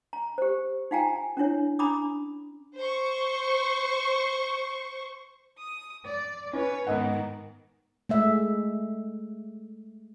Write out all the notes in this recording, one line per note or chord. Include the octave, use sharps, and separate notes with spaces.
A#5
G4 C5
D#4 F4 F5 G5 G#5 A#5
C#4 D4 E4 C#5
C#4 D4 A#5 B5 D6 D#6
C5 C#6
D#6
D5
C#4 B4 C#5
G#2 D#3 B3 D#5 F#5
G#3 A3 E5